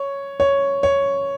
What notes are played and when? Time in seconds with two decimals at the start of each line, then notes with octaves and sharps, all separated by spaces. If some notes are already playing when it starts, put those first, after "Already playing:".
Already playing: C#5
0.40 C#5
0.83 C#5